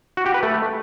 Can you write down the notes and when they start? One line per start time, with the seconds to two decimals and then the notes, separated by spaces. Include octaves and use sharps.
0.17 F#4
0.26 G4
0.34 B4
0.43 A3